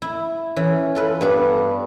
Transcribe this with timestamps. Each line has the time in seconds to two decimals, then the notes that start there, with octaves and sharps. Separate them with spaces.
0.02 E4
0.56 E3 C#4
0.95 F4 A4 B4
1.21 G2 B3 D4 B4